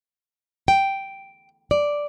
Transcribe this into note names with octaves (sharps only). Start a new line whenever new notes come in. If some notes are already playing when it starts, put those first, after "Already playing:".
G5
D5